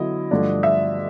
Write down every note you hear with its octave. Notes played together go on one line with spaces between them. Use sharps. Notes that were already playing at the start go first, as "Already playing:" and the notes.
Already playing: D3 F#3 B3 E4 D#5
G2 D3 F3 A3 D4
E5